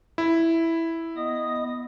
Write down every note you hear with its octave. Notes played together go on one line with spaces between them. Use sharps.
E4
B3 D#5 D#6